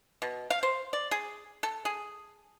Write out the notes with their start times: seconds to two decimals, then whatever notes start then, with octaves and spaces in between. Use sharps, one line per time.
0.22 B2
0.50 F5
0.63 C5
0.93 D5
1.11 G#4
1.63 A4
1.85 G#4